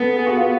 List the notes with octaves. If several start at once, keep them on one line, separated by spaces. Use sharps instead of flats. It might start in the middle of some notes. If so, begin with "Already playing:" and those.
Already playing: B3 A4
G#4
F#4
F4